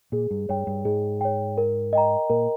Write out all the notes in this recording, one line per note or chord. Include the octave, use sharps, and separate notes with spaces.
A#2 G#4
G2
G2 C#5 G5
G2
G#2 G#4
C#5 G5
A#4
D#5 G5 A#5
A#2 A#4